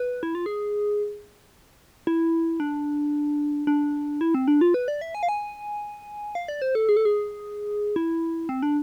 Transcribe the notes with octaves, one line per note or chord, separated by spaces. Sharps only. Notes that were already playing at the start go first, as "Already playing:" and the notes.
Already playing: B4
E4
F4
G#4
E4
D4
D4
E4
C4
D4
F4
B4
D5
E5
G#5
F5
G#5
F5
D5
C5
A4
G#4
A4
G#4
E4
C4
D4